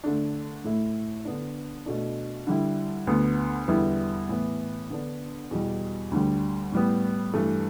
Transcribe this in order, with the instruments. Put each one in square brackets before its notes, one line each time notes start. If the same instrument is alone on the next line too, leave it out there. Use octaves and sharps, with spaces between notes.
[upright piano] D3 A3 D4
A2 A3 E4
D3 B3 D4
B2 A3 D4
D3 G3 E4
D2 D3 B3
E2 D3 G3 B3 E4
A2 E3 B3 E4
D3 B3 D4
E2 B2 G3
D2 D3 G3
A2 G3 B3
G2 E3 A3